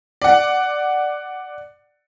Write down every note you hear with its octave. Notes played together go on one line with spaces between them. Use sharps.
D5 F#5